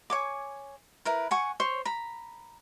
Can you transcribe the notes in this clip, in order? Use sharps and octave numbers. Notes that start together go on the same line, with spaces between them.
C#5 G#5 D6
E4 A#4 B4
F#5 G#5 C#6
C5 C#5
A#5 B5